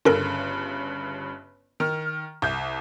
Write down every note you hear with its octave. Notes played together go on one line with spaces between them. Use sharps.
G1 G2 C#3 C#4 A4 A#4
D#3 F6
C2 G6